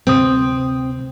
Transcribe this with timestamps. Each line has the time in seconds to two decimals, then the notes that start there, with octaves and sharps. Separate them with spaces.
0.07 D2 C3 C4 D#6